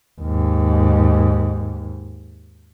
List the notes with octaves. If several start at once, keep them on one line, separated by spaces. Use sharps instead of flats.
D#2 G#2